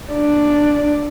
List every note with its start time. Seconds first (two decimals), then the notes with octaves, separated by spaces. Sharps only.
0.12 D4 D5